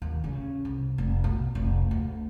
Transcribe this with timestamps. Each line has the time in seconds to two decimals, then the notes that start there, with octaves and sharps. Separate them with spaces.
0.02 D#2
0.24 C#3
0.65 C2
0.98 F1
1.24 B1
1.55 F1
1.91 D2